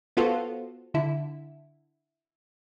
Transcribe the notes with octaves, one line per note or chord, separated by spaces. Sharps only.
B3 F4 F#4 A4 C5
D3 E4